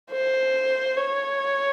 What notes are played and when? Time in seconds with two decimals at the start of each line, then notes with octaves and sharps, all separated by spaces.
0.11 C5
0.97 C#5